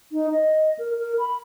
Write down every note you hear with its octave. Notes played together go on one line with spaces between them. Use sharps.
D#4
D#5
A#4
A#4
B5